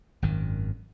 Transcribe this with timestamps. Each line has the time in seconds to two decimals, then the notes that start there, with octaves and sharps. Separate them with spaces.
0.22 G#1 F#2 D#3